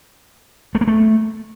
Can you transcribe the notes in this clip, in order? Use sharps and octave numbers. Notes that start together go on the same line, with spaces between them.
A3
A#3
A3